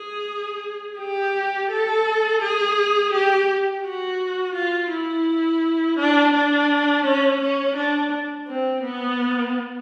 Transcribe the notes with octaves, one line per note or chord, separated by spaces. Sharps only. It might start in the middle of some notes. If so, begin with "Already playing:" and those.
Already playing: G#4
G4
A4
G#4
G4
F#4
F4
E4
D4
D4
C#4
C#4
D4
C4
B3